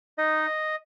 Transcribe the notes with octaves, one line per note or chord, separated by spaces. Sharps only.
D#4 D#5